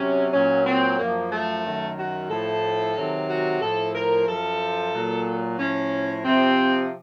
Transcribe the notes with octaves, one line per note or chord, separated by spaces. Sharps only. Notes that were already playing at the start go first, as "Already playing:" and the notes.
Already playing: C3 F#3 C#4
A#2 F#3 C#4
C4
F#2 F3 A#3
A3
F#2 D#3 F#3
F#4
A2 F3 A4
C3 D#3 F#3
F#4
A2 F3 A4
A#4
F#2 F3 A4
A#2 F#3
A2 F3 C#4
C3 F3 C4